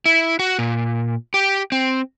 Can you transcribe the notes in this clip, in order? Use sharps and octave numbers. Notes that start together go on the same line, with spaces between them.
E4
F#4
A#2
G4
C4